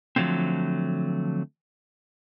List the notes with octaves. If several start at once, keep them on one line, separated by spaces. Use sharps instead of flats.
D3 F3 F#3 A3 C4